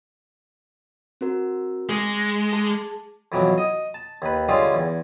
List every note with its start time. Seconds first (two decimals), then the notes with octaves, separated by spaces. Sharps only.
1.21 C4 F#4 A#4
1.89 G#3 G#4
2.53 G#4 A5
3.32 F2 B2 E3 F#3
3.58 D#5
3.94 A5
4.22 D#2 B4
4.48 D3 G3 G#3 C#4 F4
4.74 E2